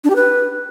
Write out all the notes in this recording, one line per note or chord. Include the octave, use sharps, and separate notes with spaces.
D4
G4
B4